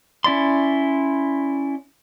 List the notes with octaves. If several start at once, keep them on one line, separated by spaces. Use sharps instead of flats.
C#4 E4 D5 C6